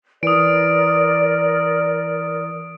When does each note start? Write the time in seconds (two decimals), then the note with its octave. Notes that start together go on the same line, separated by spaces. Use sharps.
0.23 E3 A#4 D5 D#6 D7